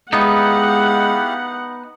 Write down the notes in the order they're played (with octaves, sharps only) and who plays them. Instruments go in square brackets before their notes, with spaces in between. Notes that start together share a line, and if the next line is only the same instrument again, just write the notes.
[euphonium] G#3 [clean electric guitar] B3 D#4 [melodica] E4 G4 F5 [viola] F#5